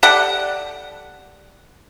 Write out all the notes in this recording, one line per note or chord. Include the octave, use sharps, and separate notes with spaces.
G4 A4 D5 F#5